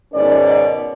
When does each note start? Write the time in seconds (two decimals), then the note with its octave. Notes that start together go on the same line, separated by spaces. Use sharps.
0.13 G#2 B2 D#3 C#4 A#4 D5